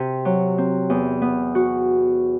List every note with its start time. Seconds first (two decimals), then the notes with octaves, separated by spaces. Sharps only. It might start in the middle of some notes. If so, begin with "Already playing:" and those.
Already playing: C3
0.25 F#3
0.58 C4
0.90 E2
1.22 B3
1.55 F#4